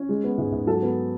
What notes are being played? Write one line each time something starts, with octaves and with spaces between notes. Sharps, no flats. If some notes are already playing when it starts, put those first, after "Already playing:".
Already playing: C#4
G#3
B3
G#2
G#2
F#3 A4
B3